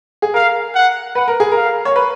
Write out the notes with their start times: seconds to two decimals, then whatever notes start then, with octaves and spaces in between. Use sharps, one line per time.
0.22 G#4
0.34 A#4 F5
0.75 F#5
1.15 B4 F#5
1.28 A#4
1.40 G#4
1.52 A#4 F5
1.85 C#5
1.96 B4